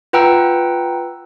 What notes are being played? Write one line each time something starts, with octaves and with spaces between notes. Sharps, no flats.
F4 B4 F#5 G5 A#5 E6